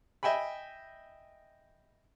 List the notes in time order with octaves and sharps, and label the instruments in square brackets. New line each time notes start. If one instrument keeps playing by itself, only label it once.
[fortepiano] D#5 E5 G5 G#5 B5